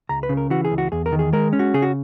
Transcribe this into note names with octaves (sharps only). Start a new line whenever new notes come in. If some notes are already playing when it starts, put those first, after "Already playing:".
C#2 A#5
B4
C#3
A#4
E3 F#4
G#4
C#2
F#4
E2 G#4
A#4
D#3
G#4
G#3 A#4
C#4
F#4
C#3 G#4
F#4